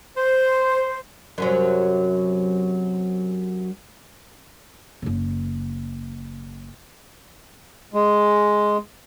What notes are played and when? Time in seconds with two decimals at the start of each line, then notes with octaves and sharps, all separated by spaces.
0.18 C5
1.38 F#2 C3 F#3
5.02 F#1 C#3
7.94 G#3